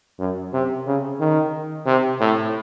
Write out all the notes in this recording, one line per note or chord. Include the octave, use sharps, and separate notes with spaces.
F#2
C3
C#3
D#3
C3
A2